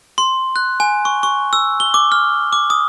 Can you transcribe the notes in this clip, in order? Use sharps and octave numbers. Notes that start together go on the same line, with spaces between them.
C6
F#6
G#5
C#6
C#6
E6
G7
D6
F6
D6
D#6